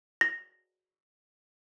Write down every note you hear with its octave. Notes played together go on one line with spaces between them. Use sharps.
A#6